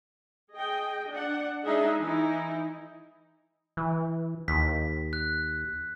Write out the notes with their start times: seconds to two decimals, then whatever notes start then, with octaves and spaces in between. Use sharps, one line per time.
0.52 G#4 D#5 G5
1.10 D4 F#5
1.63 G#3 D4 D#4 G#4 D#5 E5
2.00 E3 D#4 E4
3.77 E3
4.48 D#2 B6
5.13 F#6